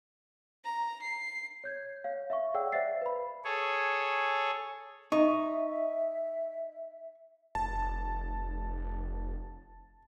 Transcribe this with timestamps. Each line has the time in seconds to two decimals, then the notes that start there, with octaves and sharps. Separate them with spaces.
0.65 A#5
1.02 C7
1.64 C#5 G6 G#6
2.04 C#5 F5
2.30 E5 F5 C#6
2.54 G#4 C#5 D5 F#5 G5 E6
2.72 C5 D5 E5 F5 A6 C7
3.01 B4 B5
3.45 G#4 A4 C#5
5.12 D#4 D#5 E5 C#6
7.55 F1 A5